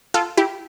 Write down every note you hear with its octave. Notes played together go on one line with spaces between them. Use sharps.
F4 A4
E4 G4